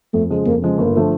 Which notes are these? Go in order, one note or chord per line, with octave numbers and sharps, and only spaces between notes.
F2 A3
C#3 F3 G#3
F2 A#3
C#3 F3 G#3
G1 A#3
D3 F3 A3